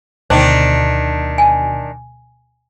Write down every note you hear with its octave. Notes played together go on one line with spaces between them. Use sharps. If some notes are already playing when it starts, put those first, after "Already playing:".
D2 B2 D#3 D4 C5
G#5